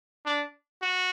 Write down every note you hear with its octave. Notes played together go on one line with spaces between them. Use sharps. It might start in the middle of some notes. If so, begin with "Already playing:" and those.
D4
F#4